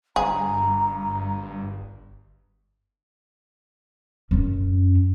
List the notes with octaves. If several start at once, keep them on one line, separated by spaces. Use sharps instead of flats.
G1 G2 G#4 A#5
F#2 C#4